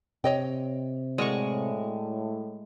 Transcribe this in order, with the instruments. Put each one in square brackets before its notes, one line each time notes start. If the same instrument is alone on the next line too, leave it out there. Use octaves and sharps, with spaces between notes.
[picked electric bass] C3 [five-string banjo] C#5 D#5 G5
[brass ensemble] A2 [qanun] G#3 C#6 [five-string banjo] F#4 A#4 D5